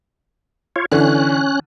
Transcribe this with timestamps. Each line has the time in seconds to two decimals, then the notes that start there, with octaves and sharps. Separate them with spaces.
0.76 F4 C#5
0.92 D3 E3 C#4 F#6